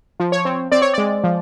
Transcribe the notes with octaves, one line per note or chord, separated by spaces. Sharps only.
F3
C#5
C4
C4 D5
C#5
G#3 D5
F3